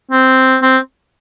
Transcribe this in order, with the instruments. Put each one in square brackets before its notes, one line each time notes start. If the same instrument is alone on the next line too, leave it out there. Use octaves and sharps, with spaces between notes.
[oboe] C4
C4